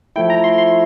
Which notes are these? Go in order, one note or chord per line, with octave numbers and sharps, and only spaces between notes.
F3 A3 E4 G5
A#5
C6
C6